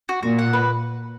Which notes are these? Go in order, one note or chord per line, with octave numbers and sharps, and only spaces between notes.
F#4
A#2 F#4
F#5
B4